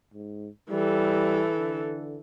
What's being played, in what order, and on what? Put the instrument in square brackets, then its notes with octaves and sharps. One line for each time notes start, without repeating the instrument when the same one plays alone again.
[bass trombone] G#2
[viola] E3 A4 [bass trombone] G3
[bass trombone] D3